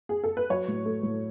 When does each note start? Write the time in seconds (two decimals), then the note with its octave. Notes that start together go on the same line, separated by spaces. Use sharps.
0.09 G#4
0.24 A4
0.37 B4
0.50 F#3 C#5
0.68 A2
0.85 A3
1.03 A2